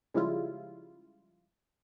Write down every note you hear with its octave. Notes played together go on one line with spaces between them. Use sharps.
C#3 F3 G3 G#3 E4 F4